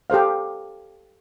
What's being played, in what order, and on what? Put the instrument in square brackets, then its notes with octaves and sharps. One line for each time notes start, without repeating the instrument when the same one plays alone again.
[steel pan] G4 A4 C5 F5